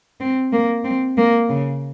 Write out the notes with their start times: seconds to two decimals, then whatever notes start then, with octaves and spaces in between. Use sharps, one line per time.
0.20 C4
0.53 A#3
0.84 C4
1.17 A#3
1.49 C#3